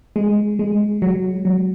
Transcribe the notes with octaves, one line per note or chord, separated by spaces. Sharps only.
G#3
G#3
F#3
F#3